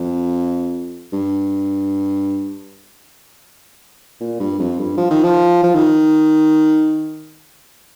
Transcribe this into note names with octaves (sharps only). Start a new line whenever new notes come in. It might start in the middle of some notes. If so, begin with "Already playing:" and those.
Already playing: F2
G2
A#2
G2
F2
G2
F3
D#3
F3
F3
D#3